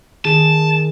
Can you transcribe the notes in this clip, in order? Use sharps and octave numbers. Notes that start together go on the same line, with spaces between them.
D#3 G#4 A5